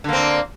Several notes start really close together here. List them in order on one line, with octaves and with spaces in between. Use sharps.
D3 A#3 C4